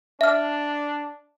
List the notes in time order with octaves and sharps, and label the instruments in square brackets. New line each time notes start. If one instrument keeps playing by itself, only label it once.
[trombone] D4 [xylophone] E5 F6